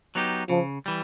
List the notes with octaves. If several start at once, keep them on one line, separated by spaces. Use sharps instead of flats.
F#3 B3 D#4 G4
C#3 F3
E3 G3